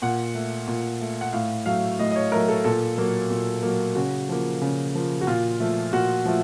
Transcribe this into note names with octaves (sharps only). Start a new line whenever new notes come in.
A#2 F#5
A3
A#2
A3
F#5
A2 F5
F#3 A3 F5
A2 D#5
D#5
C#5
F#3 A3 A#4
A4
A#2 A4
F#3 A#3
A#2
F#3 A#3
C#3 F#4
F3 A#3
C#3
F3 A#3
F#4
A#2 F4
F3 A3
A#2 F#4
F3 A3